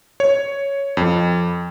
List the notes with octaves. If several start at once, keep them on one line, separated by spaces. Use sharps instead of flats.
C#5
F2